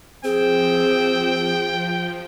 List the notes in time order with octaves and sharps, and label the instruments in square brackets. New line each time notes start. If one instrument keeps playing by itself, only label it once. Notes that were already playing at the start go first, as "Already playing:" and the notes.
[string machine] F3 [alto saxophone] C4 [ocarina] G#4 [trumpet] G5